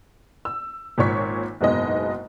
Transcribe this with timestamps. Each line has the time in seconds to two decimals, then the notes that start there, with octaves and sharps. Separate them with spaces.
0.45 E6
0.98 G#1 A#2 C#5 C#6 B6
1.61 F#1 G#2 B2 G#3 D#5